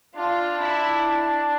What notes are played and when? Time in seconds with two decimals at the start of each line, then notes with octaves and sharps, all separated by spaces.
0.16 D4 F4
0.60 E4